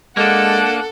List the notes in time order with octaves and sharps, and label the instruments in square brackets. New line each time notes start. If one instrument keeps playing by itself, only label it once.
[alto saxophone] G#3 [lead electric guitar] A#3 D4 [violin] A4 [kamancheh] F#5